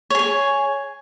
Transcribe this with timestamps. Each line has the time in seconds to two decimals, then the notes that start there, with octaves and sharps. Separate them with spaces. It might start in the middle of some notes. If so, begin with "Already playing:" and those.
0.10 C#5
0.15 G#4
0.19 G#5